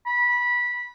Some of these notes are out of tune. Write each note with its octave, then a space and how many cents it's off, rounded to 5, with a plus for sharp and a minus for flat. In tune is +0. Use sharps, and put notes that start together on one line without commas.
B5 -20